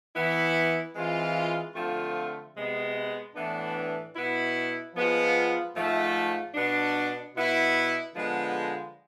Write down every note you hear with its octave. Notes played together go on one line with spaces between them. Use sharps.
E3 B3 E4
E3 G#3 C4 F4
D3 F3 A3 C4 F4
C3 G#3 B3
A2 E3 B3 D4
B2 B3 E4
F3 G#3 B3 F4
G#2 F3 A3
B2 B3 D4
B2 B3 E4
D3 F3 G#3 B3